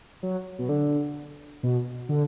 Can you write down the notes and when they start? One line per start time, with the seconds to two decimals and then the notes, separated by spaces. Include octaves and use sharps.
0.23 F#3
0.59 B2
0.69 D3
1.63 B2
2.09 D3